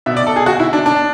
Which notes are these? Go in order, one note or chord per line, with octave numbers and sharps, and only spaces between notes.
B2 E5
D5
A4
G#4
F#4
E4
D4
D4